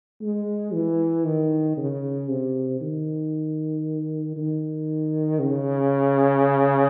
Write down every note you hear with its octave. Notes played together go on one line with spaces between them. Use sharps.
G#3
E3
D#3
C#3
C3
D#3
D#3
C#3